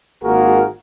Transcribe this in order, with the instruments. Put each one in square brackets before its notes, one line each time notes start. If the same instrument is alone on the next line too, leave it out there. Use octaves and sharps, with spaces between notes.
[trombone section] G#1 A#3 F4 F#4 G#4 A#4